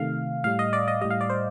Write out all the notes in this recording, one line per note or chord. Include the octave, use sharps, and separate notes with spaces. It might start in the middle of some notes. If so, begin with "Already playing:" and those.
Already playing: C3 D#3 A3 F5
A2 G3 F5
D#5
D5
D#5
A2 G3 D#5
F5
D5
C5